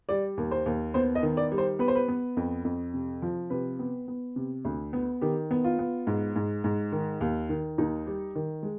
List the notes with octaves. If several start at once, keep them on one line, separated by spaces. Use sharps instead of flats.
G3 D5
D#2
C5
D#2
B3 C5
D#5
D#3
D5
G3
C5
B3 B4
C5
B4
B3
F2
F2
C3
F3
C3 B4
B3
B3
C3
D2
B3
D#3 G4
B3
F4
B3
G#2
G#2
G#2
D#3
D#2
D#3
D#2 D#4
G3
D#3
G#3